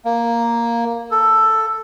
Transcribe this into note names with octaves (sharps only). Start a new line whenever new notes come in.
A#3
A4